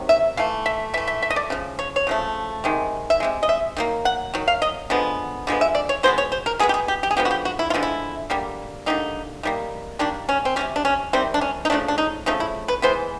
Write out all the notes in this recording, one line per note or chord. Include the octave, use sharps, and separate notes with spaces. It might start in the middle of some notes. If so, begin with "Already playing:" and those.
Already playing: C3 D#3 F#3
E5
E3 A3 F5
E5
E3 A3 E5
E5
E5
D#5
D5
C#3 F3
C#5
C#5
C#3 F3 A3
C3 D#3 G#3
E5
C3 D#3 G#3
D#5
E5
D#3 F#3 A#3
F#5
D#3 F#3
F5
D#5
D3 F3 G#3 B3
D3 F3 G#3 B3
E5
D5
C#5
B2 G#3 B3 C5
C#5
C5
A#4
B2 G#3 B3 G#4
G4
G#4
G4
G4
G#4
D3 F3 G#3 B3 G4
F#4
G4
F#4
E4
F4
D3 F3 G#3 B3
E4
D3 G3 A#3
D3 G3 A#3 D#4
D#3 G3 A#3
D#3 G3 A#3 D4
C#4
C4
C3 D#3 G3 C#4
D4
C#4
C3 D#3 G3 C4
D4
C#4
D#4
C#3 F3 A3 D4
D4
D#4
C#3 F3 A3 D#4
E4
B4
E3 G#3 B3 C5